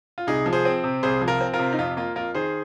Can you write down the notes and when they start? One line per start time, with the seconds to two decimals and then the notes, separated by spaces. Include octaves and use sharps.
0.18 F4
0.27 C2 D#4 G#4
0.46 F3
0.53 G#4 C5
0.65 C4
0.84 C3
1.03 C2 G#4 C5
1.22 F3
1.28 F4 A#4
1.41 C4
1.53 F4 A#4
1.59 C3
1.73 D#4
1.79 F2 F4
1.97 A#3 F4
2.16 F2 F4 A#4
2.35 D#3 G#4 C5